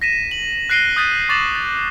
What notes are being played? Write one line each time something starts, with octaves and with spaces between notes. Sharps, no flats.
A#6 B6 D#7 E7
F#7
F#6 A#6 C7 D7 D#7 G7
D#6 F#6 G6 A6 B6 D#7
C#6 D6 A6 B6 E7 F#7
A6